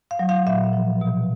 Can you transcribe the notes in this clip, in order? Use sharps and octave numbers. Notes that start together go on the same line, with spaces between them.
F5
F#3
F5
A#2 E5
F3
B2